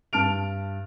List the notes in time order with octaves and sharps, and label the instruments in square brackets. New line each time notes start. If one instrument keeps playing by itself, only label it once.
[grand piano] G2 A5 F6 D7 F7